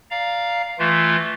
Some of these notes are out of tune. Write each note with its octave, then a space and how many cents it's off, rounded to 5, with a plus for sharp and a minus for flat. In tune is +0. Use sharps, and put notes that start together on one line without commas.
D5 +0 F5 +0 A#5 +0
E3 -5 A3 -5 F4 -10